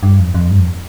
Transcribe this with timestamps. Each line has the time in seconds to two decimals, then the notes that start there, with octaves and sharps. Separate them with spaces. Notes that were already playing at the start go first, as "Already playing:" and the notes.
0.03 G2
0.19 F2
0.34 F2
0.50 G2
0.60 F2